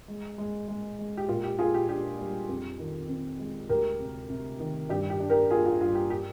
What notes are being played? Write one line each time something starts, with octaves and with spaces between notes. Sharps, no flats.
G#3
G#3
G#3
G#3
G4
A#2 F4
G4
A#2 F4 G#4
G4
D4 G4
G3
F2
D#3
C4
G#3
D2 G4 A#4
C3
C3
D#3
G2 G4
G4
D4
G4 A#4
A#3 F4 G#4
F4
G2 F4
G4
G4